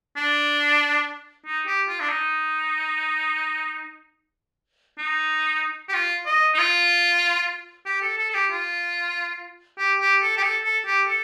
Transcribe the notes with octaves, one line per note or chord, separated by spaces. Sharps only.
D4
D#4
G4
F4
D4
D#4
D#4
G4
F4
D#5
D#4
F4
G4
A4
A4
A4
G4
F4
G4
G4
A4
G4
A4
A4
G4
A4